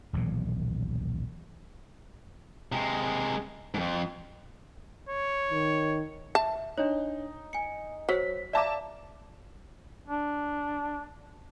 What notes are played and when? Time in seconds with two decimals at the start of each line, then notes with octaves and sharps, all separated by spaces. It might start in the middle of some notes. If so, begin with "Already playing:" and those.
0.13 D#1 B1 A#2 E3
2.72 C3 G#3
3.74 F2 G#2
5.09 C#5
5.51 D#3
6.35 E5 A5
6.78 D4 D#4 C#5
7.53 G#5 C#7
8.09 F#3 C5 C#5 B6
8.53 D5 E5 F5 A5 A#5 D6
10.07 D4